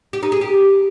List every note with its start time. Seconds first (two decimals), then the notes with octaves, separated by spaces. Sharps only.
0.13 G4
0.23 D#4
0.32 G#4
0.41 G4